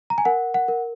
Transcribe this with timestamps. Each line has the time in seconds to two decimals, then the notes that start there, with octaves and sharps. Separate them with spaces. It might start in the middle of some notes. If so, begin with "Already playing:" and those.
0.10 A#5
0.18 G#5
0.25 A#4 F#5
0.54 F#5
0.68 A#4